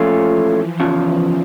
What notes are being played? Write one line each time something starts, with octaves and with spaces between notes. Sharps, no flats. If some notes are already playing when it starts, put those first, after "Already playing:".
Already playing: A#2 F3 A3 C#4 F4
E3
E2 C#3 F3